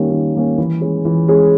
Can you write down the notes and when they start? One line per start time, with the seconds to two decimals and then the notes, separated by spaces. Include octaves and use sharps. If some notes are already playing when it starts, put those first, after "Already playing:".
Already playing: D#3 G3 A#3 C#4
0.11 D#3
0.35 G3 A#3 C#4
0.58 E3
0.81 G#3 C#4 G#4
1.05 E3
1.28 G#3 C#4 G#4